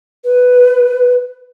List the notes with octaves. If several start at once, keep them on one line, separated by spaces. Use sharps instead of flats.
B4